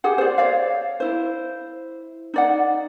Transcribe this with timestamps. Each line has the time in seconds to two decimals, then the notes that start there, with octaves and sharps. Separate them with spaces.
0.04 G4 G#4 F#5
0.18 C5 D5
0.38 C#5 D5 F5
1.00 E4 C5
2.34 D#4 D5 F#5